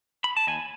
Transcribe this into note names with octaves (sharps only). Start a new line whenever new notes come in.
B5
A5
D#2 G#5